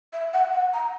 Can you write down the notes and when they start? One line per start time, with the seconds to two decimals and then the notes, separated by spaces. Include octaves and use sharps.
0.13 E5
0.33 F#5
0.53 F#5
0.73 A#5